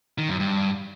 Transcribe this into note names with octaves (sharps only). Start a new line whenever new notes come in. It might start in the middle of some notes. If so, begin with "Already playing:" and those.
D#3
F#2
G2